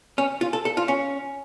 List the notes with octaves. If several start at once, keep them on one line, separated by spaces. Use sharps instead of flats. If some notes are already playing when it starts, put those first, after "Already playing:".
C#4
F4
A4
A4
F4
C#4